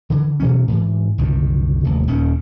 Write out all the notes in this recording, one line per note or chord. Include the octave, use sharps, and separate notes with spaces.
D3 E3
B2 E3 F#3 C#4
G#2 E3
F#1 C2 D3 D#3
F1 D#2
D#1 D#2 D#3 C#4